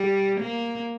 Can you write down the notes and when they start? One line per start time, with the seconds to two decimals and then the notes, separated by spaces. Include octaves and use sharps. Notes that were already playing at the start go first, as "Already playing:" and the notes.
Already playing: G3
0.40 A#3